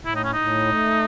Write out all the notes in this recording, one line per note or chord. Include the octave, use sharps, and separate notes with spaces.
A2 E4
D#4
C#4
D#4
A2
A3